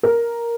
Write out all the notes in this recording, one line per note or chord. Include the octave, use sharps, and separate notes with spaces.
A#4